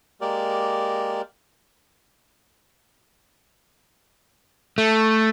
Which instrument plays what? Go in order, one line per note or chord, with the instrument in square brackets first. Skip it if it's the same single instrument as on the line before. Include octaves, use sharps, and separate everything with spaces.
[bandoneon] G#3 A#3 G4 A#4 D5
[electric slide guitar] A3